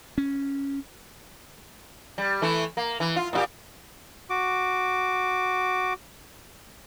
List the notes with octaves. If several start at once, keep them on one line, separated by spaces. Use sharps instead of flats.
C#4
G3
E3 A3 E4
A#3
E3
F4
A#2 E4 G4
F#4 D6